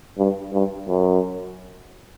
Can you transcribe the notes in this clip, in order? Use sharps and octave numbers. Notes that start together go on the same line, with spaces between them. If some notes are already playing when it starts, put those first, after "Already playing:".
G2
G2
F#2